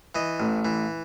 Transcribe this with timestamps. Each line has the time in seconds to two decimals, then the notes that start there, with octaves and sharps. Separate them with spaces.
0.15 E3 D#5
0.40 A1
0.65 E3